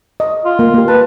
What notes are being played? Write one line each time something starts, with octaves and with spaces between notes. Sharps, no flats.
D#5
F4
A#3
A#3 G4
B4 A5